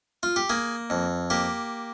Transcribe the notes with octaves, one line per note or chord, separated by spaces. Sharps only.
F4
G4
A#3 G#4
F2
A#3 G4